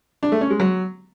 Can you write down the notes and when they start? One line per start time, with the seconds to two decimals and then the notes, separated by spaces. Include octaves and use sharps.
0.23 D4
0.32 A3
0.41 C#4
0.50 G#3
0.60 F#3